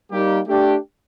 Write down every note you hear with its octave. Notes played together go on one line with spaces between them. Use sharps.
G3 A#3 D#4 G4
A3 D4 G4